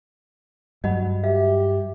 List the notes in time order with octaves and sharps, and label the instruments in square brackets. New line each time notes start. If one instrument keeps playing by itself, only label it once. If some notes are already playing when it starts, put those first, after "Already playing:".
[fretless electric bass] G2 F#3 [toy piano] D#5 F#5 B5
[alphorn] G4 [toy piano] E5 F5